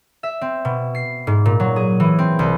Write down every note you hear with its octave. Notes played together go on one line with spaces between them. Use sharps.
E5
C4
B2
C7
G#2
A#2
F#3
G#4
E3
C4
C2